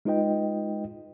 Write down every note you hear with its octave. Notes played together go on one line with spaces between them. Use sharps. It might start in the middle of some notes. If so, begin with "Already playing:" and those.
G#3 D#4 F4 B4 D#5 G5